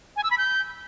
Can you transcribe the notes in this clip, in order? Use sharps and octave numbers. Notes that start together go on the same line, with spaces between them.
G#5
E6
B5
G6